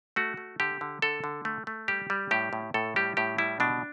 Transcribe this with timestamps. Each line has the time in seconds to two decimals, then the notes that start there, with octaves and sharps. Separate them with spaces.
0.16 A3 F#4
0.37 A3
0.60 D3 G4
0.81 D3
1.02 D3 A4
1.24 D3
1.45 A3
1.67 A3
1.88 G3 G4
2.10 G3
2.31 A2 G4
2.53 A2
2.74 A2 A4
2.96 G3 G4
3.17 A2 G4
3.38 G3 E4
3.60 B2 D4